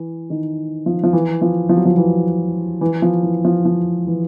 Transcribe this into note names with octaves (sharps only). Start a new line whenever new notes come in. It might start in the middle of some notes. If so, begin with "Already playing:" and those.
Already playing: E3
D#3
F3
F3
E3
F3
F3
F#3
F3
E3
E3
F3
E3
F3
F3
E3